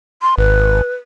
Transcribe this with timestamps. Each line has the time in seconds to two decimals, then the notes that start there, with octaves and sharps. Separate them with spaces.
0.22 C6
0.38 G#1 B4